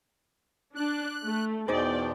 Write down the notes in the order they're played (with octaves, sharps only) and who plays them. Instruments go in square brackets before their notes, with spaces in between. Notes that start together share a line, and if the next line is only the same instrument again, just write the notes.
[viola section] D4 [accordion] F#6
[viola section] A3
[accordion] E2 B2 [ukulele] D#4 G#4 C5 [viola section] D5 G5